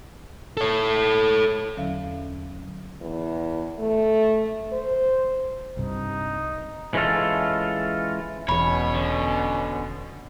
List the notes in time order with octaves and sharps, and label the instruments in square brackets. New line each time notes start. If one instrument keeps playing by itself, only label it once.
[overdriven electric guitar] A4 C#5
[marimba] E2 D3 F#3 C#4 E5 F5
[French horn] E2
A3
C5
[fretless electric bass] C2 G2 C3 [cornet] D#4
[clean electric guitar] E3 G#3 C#4 F4 A4
[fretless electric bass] E1 E2 [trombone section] B2 C#4 [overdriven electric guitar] C#5 [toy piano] B5
[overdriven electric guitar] D3